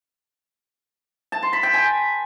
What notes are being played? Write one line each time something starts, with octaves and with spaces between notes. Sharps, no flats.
A5
C6
B5
G5
G#5